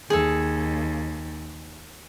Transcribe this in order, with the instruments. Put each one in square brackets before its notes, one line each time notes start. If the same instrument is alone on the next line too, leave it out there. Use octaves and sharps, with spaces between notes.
[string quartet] D#2 [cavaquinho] G#4 A4